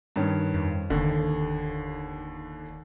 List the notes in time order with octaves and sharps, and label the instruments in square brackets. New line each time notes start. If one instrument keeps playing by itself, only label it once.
[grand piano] G2 D#3 C#4
[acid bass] F2
[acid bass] F1 [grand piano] D#2 [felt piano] D3